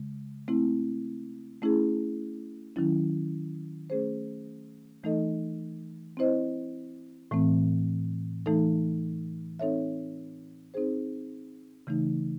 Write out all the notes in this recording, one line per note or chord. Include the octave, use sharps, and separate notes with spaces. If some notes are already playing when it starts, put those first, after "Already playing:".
Already playing: C#3 G#3
A3 C4 E4
A3 C#4 E4 G#4
D#3 F#3 C#4 E4
A3 C#4 G#4 C5
E3 A3 D#4 A4 D#5
C4 E4 C5 D#5
A2 E3 A3 C4
E3 A3 D#4 A4
C4 D#4 A4 C#5 E5
C4 D#4 G#4 C5
C#3 E3 A3 D#4